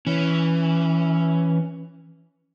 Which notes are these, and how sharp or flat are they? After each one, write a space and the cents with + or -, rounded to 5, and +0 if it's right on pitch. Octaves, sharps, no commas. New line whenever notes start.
E3 +0 C#4 +5